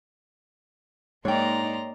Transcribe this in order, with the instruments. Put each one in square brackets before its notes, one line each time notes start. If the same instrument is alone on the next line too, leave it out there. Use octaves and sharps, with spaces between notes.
[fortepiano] G#2 [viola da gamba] A#3 D#4 D5 [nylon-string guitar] C#5 G5 [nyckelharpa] A#5 C6